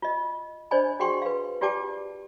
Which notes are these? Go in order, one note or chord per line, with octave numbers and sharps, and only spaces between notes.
F4 D#5
D4 C5 D5 D#5 G#5 B5
F#4 G#4 F#5 G5 C6 C#6
B4 F5
F4 G4 D5 G5 A5 D6